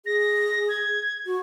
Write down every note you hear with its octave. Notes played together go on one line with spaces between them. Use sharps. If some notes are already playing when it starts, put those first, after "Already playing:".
G#4 A#6
G#6
F#4